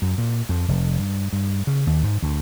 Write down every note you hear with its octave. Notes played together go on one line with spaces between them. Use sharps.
F#2
A#2
F2
F1
G2
G2
C#3
D#2
G#2
D2